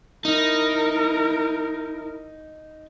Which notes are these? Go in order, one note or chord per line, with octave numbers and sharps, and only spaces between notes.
D#4 E4 A#4